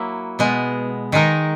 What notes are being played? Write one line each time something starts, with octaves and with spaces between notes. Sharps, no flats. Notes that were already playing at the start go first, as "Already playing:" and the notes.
Already playing: F#3 A#3 E4
B2 G#3 B3
D#3 G#3 D#4 A#4